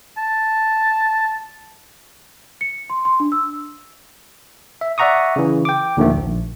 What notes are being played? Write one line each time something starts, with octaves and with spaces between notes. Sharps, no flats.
A5
C#7
C6
C6
D4
E6
E5
D5 E5 F#5 A#5 C#6 D#6
C#3 E3
G5 D6
D#2 A#2 D3 D#3 F3 A3
A#1